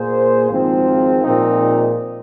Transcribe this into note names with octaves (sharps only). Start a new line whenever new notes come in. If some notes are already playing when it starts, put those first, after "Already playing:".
Already playing: A#2 A#3 G#4 C5
G#1 G#2 F3 C4
A#2 F3 G#3 C4 D#4